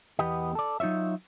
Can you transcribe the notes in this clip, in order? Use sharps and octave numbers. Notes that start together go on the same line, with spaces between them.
E2 B3 G4 D#5
A4 D5
F#3 D#4 F4 C#5 E5